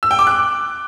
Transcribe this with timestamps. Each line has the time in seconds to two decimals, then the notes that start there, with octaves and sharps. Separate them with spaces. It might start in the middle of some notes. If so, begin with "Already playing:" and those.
0.03 E6
0.11 G5
0.19 D6
0.27 F#6